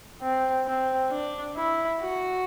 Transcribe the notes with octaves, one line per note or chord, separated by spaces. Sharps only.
C4
C4
D4
E4
F#4